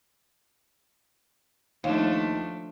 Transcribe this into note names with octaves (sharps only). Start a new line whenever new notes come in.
D#2 F3 A3 D4